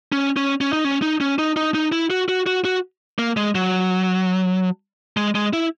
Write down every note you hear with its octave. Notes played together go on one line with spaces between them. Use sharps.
C#4
C#4
C#4
D#4
C#4
D#4
C#4
D#4
D#4
D#4
E4
F#4
F#4
F#4
F#4
A#3
G#3
F#3
G#3
G#3
E4